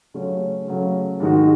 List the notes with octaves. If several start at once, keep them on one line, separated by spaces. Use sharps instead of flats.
C#3 F#3 A3 C#4
C#3 F#3 A3 C#4
G#2 D#3 G#3 D#4 F#4